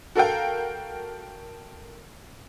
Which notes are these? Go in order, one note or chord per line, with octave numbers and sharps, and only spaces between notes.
F#4 A4 A#4 F5 G5